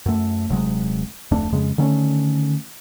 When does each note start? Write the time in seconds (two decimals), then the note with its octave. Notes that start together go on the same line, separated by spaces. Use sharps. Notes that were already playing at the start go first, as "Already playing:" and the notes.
0.06 F#2 A3
0.49 D#1 C3 F#3 G#3
1.31 D1 F2 A3 D4
1.52 F2 C#3 G#3
1.78 D3 D#3 A3 C#4